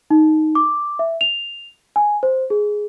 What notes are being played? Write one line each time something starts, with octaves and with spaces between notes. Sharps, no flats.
D#4
D6
E5
F7
G#5
C5
G#4